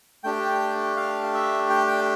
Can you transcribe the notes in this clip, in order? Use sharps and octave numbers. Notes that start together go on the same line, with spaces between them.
A3 D4 G4 G5
F5
E5
G5
G5